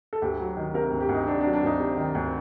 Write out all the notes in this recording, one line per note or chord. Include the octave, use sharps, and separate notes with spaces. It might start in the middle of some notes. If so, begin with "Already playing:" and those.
A4
D2 G4
F#3
D#3
C3 A#4
D2
G4
D2
D#4
C3 D4
D4
F#3
D4
D2 D#4
C3
D#3
D2